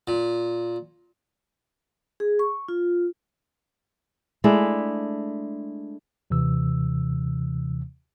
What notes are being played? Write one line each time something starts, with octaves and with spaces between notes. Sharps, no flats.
A#2
G#4
C#6
F4
G#3 A3 D4 E4
D#2 C3 E3 E6